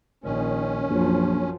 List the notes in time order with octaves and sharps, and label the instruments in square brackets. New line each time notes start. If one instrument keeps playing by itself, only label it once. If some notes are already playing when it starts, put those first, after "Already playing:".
[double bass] A#1 D#3 [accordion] C#4
[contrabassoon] A#1 [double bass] F#2 F3